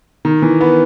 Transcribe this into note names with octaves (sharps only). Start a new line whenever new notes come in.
D#3
E3
B3